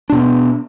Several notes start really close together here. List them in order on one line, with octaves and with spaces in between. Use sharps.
D4 B2 B3